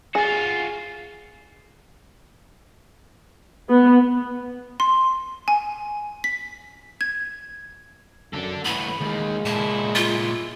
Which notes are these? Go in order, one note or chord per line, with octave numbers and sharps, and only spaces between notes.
F4 F#4 G#4
B3
C6
G#5
B6
G#6
F#2 D4 A4
A2 E3 B3 B5
D#2 D#3 G#3
A#2 E4 A5
F4